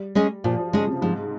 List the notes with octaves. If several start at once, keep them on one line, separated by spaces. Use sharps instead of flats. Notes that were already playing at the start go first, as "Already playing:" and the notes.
Already playing: G3
G#3 C#4 G#4 D#5
A#2 F3
F3
C#3 G#3 C#4 G#4 D#5
C3
G#2 F3